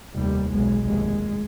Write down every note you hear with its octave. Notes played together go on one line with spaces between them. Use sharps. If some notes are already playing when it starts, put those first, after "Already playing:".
F1 D#2 G3
B1 B2 G#3
F1 D#2 G#3